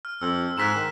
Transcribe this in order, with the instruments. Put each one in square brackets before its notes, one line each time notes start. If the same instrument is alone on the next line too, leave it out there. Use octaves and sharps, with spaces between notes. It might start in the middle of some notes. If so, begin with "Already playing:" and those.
[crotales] F6
[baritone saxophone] F2 [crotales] E6
[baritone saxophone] G#2 [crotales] F#6 B6 E7
[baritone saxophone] D#3